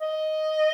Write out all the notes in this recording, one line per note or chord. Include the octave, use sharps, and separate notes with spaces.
D#5